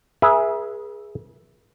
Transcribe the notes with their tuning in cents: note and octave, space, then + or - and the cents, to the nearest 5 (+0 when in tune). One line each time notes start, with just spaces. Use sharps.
G#4 +0 B4 -45 E5 +0